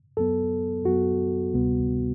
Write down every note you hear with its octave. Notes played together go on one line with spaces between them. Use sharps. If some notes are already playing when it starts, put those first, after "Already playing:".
F#2 F#3 B3 A4
F#2 F#3 B3 F#4
D2 C3 G3 B3